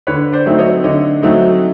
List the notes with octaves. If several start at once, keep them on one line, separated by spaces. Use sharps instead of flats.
D3 B4 C#5
C5 D5
F#3 A3 C4 D#4
C#5 D#5
D3 C#5 D#5
F#3 A3 C4 D#4